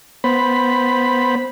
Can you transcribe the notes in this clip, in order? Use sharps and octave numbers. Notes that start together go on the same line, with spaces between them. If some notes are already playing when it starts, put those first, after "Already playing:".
B3 C5 B5